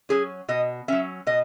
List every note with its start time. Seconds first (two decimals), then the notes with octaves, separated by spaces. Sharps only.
0.09 F#3 C#4 G#4
0.49 B2 D#5
0.88 F#3 C#4 E5
1.27 B2 D#5